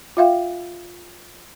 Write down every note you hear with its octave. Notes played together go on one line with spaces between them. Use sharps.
F4 E5 F5 G5